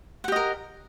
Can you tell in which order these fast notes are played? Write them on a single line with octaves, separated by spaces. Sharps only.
F#5 G4 D#5 A#4